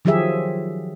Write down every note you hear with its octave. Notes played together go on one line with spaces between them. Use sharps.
D#3 F3 F#3 G4 G#4 E5